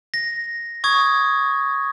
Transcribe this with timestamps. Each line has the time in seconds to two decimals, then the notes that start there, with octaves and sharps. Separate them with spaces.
0.14 A#6
0.84 C#6 D#6 G#6